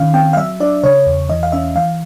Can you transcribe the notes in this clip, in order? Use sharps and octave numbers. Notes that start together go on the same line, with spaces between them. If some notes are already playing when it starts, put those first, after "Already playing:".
Already playing: D#3 C#4 F5
C4 G5
F5
F#3 E5
D4 D5
C#3 C#5
E2
E3 D#5
F5
C#4 E5
E3 F5